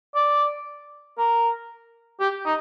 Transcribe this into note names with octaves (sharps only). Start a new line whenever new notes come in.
D5
A#4
G4
D#4